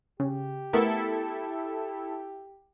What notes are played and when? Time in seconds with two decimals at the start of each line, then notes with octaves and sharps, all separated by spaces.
0.20 C#3 G4
0.73 A3 B3 E4 A4 A#4 E5